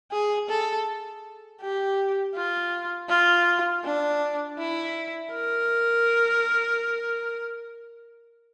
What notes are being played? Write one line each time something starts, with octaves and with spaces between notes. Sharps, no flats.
G#4
A4
G4
F4
F4
D4
E4
A#4